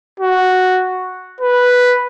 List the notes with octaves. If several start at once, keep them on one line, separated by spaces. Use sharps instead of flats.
F#4
B4